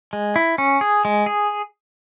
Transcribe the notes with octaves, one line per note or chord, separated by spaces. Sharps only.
G#3
E4
C#4
G#4
G#3
G#4